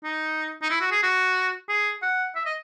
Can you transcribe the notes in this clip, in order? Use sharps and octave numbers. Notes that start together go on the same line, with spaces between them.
D#4
D#4
E4
F#4
G#4
F#4
G#4
F#5
E5
D#5